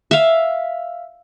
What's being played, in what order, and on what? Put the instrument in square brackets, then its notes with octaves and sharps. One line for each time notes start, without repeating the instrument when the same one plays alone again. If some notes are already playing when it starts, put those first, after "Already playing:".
[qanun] E5 F5